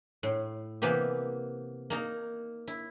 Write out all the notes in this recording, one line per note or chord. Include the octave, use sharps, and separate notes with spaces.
A2
C3 E3 A#3 B3 G4
A#3 D#4 A#5
E4